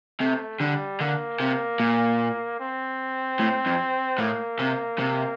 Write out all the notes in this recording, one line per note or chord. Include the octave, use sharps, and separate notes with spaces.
C3 A3
D3 G3
D3 A#3
C3
A#2
C4
A2
F2
A2 A#3
C3
C3